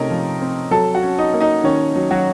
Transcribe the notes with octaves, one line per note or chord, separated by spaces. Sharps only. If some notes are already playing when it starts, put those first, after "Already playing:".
Already playing: C3 A3 C#4 D#4 A#4 D#5
F3
C4
F#3 A4 A5
F#4 F#5
C#4
D#4 D#5
A#3
D#4 D#5
D#3 C#4 C#5
F#3
F#3 F#4